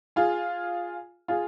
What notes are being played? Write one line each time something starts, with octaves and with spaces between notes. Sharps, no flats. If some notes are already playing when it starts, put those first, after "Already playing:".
F4 G#4
F4 G#4